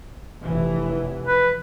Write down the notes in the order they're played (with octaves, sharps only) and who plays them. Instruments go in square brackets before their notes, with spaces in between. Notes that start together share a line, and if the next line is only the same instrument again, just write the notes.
[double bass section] F1 E3
[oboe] B4